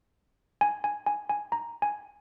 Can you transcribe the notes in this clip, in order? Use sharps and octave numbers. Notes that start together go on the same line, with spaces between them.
G#5
G#5
G#5
G#5
A#5
G#5